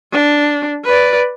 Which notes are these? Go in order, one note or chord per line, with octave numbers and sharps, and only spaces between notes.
D4
B4 D5